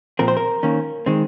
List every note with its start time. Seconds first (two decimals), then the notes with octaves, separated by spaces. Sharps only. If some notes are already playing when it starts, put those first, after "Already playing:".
0.19 A#2 F3 C4 A#4
0.28 C5
0.37 A#4
0.63 D#3 A#3 C#4
1.06 D#3 G#3 C4